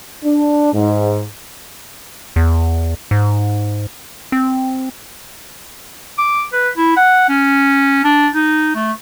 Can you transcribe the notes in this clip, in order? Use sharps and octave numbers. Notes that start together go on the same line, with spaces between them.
D4
G#2
E2
G#2
C4
D6
B4
E4
F#5
C#4
D4
D#4
A3